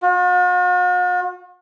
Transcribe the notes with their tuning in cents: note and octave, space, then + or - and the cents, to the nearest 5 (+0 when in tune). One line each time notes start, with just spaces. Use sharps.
F#4 -45